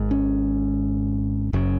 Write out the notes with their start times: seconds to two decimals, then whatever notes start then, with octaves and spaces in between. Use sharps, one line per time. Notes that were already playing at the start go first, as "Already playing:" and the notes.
Already playing: G#1 G#2
0.11 C#4
1.53 F#1 F#2 C#3